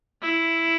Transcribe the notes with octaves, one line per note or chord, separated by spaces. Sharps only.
E4